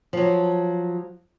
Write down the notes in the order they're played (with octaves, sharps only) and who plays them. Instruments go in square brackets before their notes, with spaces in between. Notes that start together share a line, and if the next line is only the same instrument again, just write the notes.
[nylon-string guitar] F3 F#3